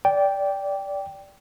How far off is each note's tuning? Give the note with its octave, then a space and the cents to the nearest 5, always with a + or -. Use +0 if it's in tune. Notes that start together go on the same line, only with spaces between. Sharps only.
D5 -15 G5 +0